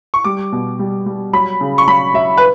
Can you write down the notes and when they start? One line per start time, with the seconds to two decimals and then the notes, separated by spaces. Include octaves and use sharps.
0.14 C#6
0.24 G3 D6
0.52 B2
0.79 G3
1.06 G3
1.33 F#3 B5
1.61 C#3
1.78 C#6
1.88 F#3 B5
2.14 F#3 E5
2.37 B4